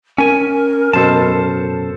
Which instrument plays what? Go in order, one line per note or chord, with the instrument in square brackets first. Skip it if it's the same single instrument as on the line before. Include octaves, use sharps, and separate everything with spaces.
[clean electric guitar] C#4 G#5 [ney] A#4
[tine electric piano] F#2 B2 [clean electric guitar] A4 C5 A5